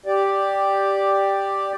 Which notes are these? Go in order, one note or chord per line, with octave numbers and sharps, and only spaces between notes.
G4 D5